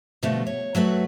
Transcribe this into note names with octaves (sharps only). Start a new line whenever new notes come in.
B2 D3 F3 G3 A3 D#5
C#5
F#3 A3 F#4 B4